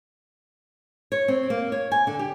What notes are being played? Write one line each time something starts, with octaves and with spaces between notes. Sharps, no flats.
C#5
C4
A#3
C#5
G#5
D3
G4